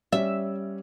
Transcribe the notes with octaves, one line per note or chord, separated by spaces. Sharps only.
G3 C#4 D5 E5